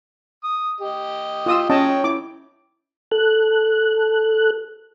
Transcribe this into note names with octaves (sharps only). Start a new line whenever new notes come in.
D#6
G4 D#5
F4 D#6 E6
C#4 C#5 D#5 G5 A5
E4 D6
A4 F#6